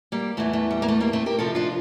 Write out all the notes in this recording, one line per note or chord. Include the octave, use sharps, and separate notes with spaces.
G3 A#3
E2 E3 A3
A3
G3
A#3
A3
G3 A#3
A3 C4
G4 A#4
F2 C3 F3 F4 A4
D4 F4